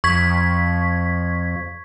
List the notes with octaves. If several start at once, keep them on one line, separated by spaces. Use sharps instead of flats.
F2 C#6 G#6 B6